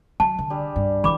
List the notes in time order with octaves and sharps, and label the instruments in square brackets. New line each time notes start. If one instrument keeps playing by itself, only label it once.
[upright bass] F#3 [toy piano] A5
[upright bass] D3
[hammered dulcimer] G3 D4 G#4
[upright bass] G2
[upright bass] E3 F3 [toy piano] B5 D6